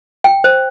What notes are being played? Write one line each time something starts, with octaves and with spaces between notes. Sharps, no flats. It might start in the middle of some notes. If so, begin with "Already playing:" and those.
G5
C5